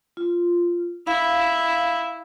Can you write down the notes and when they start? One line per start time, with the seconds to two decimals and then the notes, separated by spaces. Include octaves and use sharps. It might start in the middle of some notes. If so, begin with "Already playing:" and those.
0.17 F4
1.07 E4 F5